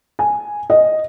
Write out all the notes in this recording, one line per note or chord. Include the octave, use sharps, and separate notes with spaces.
G#5
D#5